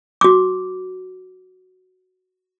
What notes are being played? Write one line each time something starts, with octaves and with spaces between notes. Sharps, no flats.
F#4 D6